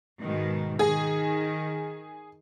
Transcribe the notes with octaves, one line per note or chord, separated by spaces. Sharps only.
G#2 B2 D#3
D#3 G#4